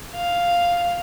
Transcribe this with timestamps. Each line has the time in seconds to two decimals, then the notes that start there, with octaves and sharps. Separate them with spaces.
0.15 F5